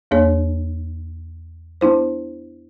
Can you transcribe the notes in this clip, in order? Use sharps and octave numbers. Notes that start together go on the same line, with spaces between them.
E2 A#3 D4 G#4 C#5
B3 D4 E4 C5